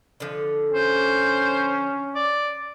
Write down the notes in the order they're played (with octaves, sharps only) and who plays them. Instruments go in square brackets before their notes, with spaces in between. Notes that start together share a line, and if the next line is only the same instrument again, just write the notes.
[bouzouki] D3 F3
[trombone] C#4 [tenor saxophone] C5
[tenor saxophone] D5